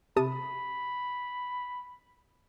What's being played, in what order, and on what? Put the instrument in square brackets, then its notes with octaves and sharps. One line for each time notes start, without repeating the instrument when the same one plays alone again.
[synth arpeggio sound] C3 A5 D#6 [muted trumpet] B5